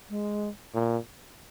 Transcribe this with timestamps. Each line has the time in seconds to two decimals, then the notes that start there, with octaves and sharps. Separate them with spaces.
0.10 G#3
0.75 A#2